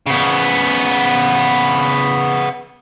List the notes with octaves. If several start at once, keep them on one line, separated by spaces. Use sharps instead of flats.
C#3 B3